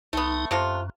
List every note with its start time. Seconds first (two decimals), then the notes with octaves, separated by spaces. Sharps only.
0.13 C2 A3 B3 D#4
0.51 F#2 C3 A3 F4